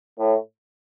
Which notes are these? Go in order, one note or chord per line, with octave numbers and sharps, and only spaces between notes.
A2